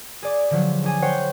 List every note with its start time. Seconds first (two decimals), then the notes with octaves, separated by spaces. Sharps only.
0.23 G#4 D5 D6
0.51 D3 F3 F#3
0.84 D4 G#4 G#5
1.02 C5 C#5 F#5 G5